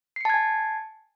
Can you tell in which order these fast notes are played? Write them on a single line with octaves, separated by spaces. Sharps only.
C7 C#7 A5 G#6 G#5